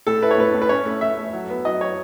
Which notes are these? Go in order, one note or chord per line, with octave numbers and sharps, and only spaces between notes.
A2 A4
E4 B4
C#5
A2 B4
A2
B4
C#4 C#5
A3
A3 E5
A3
F#3
B3
F#3 D#5
F#3 C#5